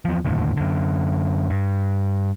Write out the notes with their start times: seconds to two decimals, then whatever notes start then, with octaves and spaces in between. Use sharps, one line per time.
0.05 E2 F3
0.25 F1 D#2 A2 D3
0.57 F#2 D3
1.50 G2